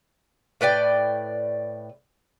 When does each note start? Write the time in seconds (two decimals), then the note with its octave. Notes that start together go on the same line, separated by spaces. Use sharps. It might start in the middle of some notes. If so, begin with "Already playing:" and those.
0.61 A2 B4 D5 G5